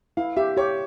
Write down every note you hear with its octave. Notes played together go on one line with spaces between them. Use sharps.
E4 F5
G4 E5
G4 C#5